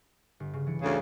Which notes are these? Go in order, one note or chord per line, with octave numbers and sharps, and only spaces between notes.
G1
C#3
E3 D4 C#7
D2 C#3